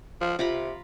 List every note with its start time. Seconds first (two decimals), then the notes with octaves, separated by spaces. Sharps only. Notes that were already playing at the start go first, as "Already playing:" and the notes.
0.21 F3
0.39 C3 F4 A#5 B5